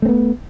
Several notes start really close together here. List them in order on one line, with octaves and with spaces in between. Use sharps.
A3 C4 B3